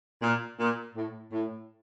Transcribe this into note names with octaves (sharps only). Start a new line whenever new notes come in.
A#2
A#2
A2
A2